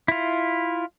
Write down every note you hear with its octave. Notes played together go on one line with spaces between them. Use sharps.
E4 F4